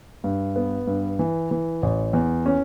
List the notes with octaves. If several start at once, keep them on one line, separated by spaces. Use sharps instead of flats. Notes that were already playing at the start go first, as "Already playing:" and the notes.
G2
B3
G2
E3
E3
A1
E2
C#4